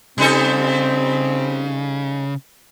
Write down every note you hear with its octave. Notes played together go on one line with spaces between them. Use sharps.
C#3 G3 C4 D#4 A4